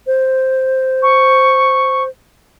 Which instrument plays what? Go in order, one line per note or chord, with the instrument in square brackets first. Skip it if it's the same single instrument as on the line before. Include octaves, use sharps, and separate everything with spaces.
[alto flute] C5
[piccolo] C#6